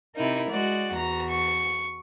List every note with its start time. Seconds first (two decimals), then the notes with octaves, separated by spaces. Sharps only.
0.16 C3 D#4 E4 A#4
0.50 G#3 F#4 D5
0.94 E2 F#4 A#5
1.30 C#6